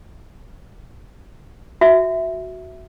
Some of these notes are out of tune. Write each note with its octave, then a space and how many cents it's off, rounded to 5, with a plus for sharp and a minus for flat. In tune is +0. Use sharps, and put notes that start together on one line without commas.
F#4 +0 E5 -5